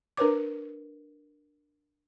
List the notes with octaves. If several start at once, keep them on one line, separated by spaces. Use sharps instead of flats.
D4 A#4 B4 C#5 D6